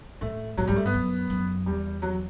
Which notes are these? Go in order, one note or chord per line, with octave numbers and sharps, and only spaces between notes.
A2 A3
A2 F#3
A2 G3
A3
G2 B3
F#2
F#2
E2 G3
F#3